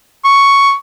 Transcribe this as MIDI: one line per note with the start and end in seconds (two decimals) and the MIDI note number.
0.24 0.73 85